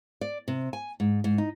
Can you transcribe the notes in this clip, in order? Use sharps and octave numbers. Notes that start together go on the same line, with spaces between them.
D5
C3
G#5
G#2
G#2
D#4